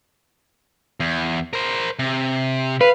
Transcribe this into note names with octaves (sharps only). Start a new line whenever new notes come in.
E2
A#4 C5
C3
B4 F5